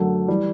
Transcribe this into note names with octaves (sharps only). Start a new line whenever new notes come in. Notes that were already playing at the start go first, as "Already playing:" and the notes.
Already playing: F#2 D3 F#3 A3
E3 G3